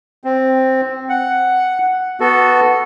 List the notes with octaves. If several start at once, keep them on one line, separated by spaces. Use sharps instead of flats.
C4
F#5
B3 F#4 A4